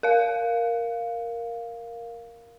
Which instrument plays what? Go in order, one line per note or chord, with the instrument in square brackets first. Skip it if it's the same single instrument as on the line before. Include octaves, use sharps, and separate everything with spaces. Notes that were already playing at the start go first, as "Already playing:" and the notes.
[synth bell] A#4 F5